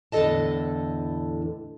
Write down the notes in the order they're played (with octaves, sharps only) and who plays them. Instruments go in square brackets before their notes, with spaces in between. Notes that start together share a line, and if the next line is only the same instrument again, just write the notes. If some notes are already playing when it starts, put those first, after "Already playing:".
[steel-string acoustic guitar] E2 A2 D3 A4 D#5 A5